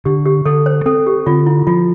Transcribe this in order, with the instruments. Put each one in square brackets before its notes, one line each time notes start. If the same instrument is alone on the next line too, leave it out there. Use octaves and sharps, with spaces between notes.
[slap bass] D3 [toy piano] G4
[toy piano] G4
[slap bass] D3 [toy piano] A4
[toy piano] C5
[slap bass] C4 [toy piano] A4
[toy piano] G4
[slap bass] D3 [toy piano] F4
[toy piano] E4
[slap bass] F3 [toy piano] F4